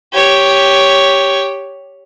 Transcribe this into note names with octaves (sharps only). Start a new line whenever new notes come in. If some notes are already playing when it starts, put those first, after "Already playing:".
G4 C#5